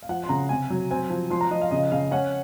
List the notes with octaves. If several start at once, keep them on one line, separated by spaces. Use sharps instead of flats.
F5
F3 F#5
C6
C#3 A#5
C3 G#5
F#3
C4 G#5
F3
F3 C6
A#5
F3 D#5
F5
C#3 D#5
C#3 F5
C#4 F#5